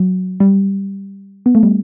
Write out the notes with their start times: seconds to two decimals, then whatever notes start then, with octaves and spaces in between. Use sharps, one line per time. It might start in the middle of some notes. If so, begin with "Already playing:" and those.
Already playing: F#3
0.40 G3
1.46 B3
1.55 A3
1.63 G3